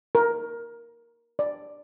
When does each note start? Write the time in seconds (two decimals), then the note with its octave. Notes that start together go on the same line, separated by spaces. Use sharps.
0.15 A#4
1.39 D5